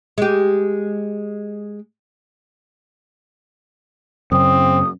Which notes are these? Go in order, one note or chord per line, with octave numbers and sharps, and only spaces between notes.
G#3 G4
F#2 C#3 C4 D#6